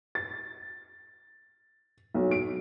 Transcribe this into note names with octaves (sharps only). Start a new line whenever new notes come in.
A6
B1
D7